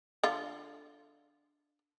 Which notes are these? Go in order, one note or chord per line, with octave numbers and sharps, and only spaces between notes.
D3 F4